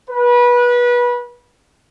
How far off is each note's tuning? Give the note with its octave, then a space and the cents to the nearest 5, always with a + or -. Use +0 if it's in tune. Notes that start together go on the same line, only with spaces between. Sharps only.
B4 -25